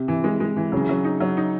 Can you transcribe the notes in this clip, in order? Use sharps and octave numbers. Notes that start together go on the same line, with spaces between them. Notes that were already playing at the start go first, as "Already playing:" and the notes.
Already playing: C3
E3
G#3
G#3
E3
C#3 F#3
F#3
D#4
F#3
D#4